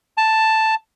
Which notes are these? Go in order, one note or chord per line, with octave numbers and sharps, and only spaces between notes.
A5